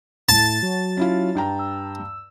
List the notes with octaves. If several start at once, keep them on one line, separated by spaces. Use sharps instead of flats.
A2 A5
F#3
C#4 E4 F4
G2 G5 A#5
E6